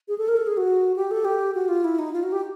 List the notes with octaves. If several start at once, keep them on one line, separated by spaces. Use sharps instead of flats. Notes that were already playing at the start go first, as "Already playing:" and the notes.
G#4
A4
A#4
A4
G#4
F#4
G4
A4
G4
F#4
F4
E4
D#4
F4
F#4
G4